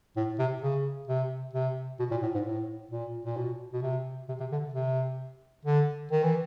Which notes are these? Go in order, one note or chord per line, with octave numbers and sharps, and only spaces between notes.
A2
C3
C#3
C3
C3
B2
A#2
A2
G#2
A2
A#2
A#2
B2
B2
C3
C3
C3
D3
C3
D3
D#3
E3